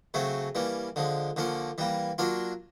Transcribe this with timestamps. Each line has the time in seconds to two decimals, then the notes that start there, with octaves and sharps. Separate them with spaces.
0.14 C#3 F#3 A3 C4
0.55 E3 G3 A#3 C#4
0.96 D3 F3 G#3
1.37 D3 F3 A#3 C#4
1.78 E3 G3 A#3
2.18 F#3 A#3 D4 F4